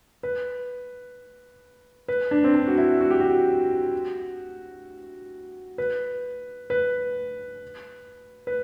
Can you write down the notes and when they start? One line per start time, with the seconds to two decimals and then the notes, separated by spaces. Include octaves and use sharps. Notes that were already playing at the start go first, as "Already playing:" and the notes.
0.23 B4
2.08 B4
2.31 D4
2.44 C4
2.54 D4
2.68 F#4
2.78 E4
3.01 F#4
3.10 G4
3.20 F#4
5.78 B4
6.70 B4
8.47 B4